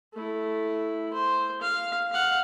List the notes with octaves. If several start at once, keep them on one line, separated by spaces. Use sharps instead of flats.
A3 E4
C5
F5
F5 F#5